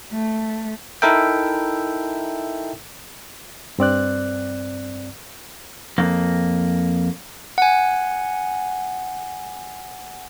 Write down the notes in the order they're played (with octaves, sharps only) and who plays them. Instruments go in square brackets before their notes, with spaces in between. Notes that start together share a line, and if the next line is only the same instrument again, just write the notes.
[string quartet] A3
[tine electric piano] D#4 E4 A4 A#4 E5 G5
[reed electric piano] G2 C4 D5 F#6
[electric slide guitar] F2 A#3
[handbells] F#5 G#5